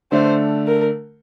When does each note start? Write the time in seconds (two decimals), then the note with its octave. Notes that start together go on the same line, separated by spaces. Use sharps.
0.12 D3 A3 D4 C5
0.67 A#4